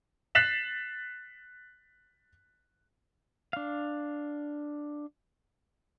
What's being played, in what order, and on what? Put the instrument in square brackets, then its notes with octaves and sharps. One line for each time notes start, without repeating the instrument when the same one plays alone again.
[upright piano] F#6 A6 B6 C7 E7 F#7
[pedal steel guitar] D4 F5